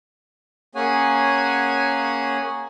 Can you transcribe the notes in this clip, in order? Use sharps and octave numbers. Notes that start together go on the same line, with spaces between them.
A#3 C#4 G#4 C#5 F#5 G#5